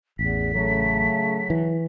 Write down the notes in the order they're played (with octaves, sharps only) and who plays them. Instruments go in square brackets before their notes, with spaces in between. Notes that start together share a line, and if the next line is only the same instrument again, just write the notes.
[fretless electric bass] A1 [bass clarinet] E2 [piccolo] B6
[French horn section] C#3 A3 [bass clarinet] F#3
[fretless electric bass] E3